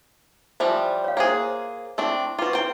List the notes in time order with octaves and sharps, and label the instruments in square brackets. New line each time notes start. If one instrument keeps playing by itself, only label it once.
[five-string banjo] E3 F3 G3 [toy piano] C5 E5
[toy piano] C#5 F5
[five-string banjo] A#3 F4 G#4 [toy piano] C5 C#5
[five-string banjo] A3 C4 D4 [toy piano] E4 E6
[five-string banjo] F4 F#4 [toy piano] B4 D6
[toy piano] E4 [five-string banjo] C5 G5